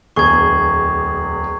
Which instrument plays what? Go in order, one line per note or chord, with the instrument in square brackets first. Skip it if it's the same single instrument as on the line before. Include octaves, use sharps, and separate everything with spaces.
[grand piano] D1 E2 G#4 [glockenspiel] C#6 G#6